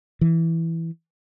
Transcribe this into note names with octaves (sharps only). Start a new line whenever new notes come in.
E3